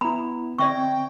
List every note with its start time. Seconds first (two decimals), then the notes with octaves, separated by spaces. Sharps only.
0.01 B3 E4 A#5 B5
0.58 D3 C4 D5 E5 G5 C#6